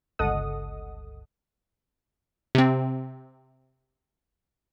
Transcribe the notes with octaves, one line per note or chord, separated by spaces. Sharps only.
G1 C#2 A4 D#5 F#5 D#6
C3 C4